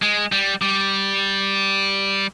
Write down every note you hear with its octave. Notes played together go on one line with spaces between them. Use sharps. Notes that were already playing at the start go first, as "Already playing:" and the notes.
G#3
G3
G3